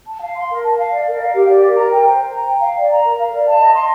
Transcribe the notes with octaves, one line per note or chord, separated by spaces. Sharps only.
A5
F5
C6
A#4
A5
F5
D5
A#4
F5
G4
D5
A#4
A#5
G5
C5
C5
A#5
G5
F5
D5
A#5
A#4
F5
D5
A5
D#5
C6